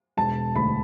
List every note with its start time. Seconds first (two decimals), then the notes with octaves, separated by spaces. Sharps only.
0.17 E1 A5
0.55 D2 B5